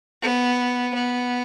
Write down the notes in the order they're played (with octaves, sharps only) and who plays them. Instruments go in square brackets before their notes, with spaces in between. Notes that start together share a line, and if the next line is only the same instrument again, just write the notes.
[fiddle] B3
B3